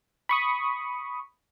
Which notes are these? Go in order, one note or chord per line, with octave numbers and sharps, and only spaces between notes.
B5 C#6 D#6